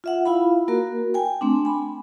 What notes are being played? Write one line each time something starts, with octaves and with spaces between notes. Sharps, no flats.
F4 E5 F#5
E4 F4 F5 B5
A#3 F#4 A#4
G5 G#5
A3 C4 D4
G#5 B5